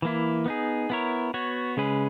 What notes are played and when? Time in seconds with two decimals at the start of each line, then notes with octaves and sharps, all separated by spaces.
0.02 E3 A#3 E4
0.46 B3 D#4 G#4
0.90 B3 E4 A#4 C#5
1.34 B3 F#4 C#5
1.77 C#3 G#3 C#4 G#4 B4